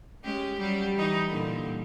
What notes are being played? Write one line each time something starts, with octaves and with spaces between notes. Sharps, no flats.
G#3 C#4 G4
F#3 G3 G4
E3 D#4
A#2 D3 G3